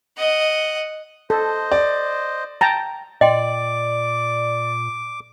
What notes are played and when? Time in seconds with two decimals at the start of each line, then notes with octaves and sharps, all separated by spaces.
0.17 D#5 F#5
1.30 A4 C5 D#5
1.72 D5
2.61 G5 A5 A#5
3.21 A#2 D5 D#5 G5 C6 D6